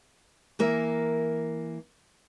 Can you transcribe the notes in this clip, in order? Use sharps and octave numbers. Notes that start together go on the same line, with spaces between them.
E3 A#3 A#4 E5